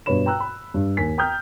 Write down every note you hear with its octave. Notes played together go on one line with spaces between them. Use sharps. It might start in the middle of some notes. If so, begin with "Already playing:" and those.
G2 B2 B4 C#5 B5 E7
G5 A#5 E6 F#6
B5
G2
D#2 G#5 B6
G5 A#5 D#6 F6 G6